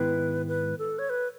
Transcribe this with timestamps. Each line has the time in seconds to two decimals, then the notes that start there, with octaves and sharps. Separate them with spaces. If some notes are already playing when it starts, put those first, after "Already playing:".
Already playing: G#2 D#3 G#3 B3 E4 B4
0.48 B4
0.79 A4
0.99 C#5
1.10 B4